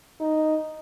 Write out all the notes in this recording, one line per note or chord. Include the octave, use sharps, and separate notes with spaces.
D#4